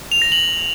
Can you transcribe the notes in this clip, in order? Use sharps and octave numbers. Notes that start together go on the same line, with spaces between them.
F7
A#6
F#7